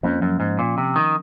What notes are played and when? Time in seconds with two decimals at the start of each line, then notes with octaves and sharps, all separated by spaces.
0.03 F2 F3 A#3 C#4
0.22 F#2
0.40 G#2
0.59 A#2
0.78 C3
0.96 D#3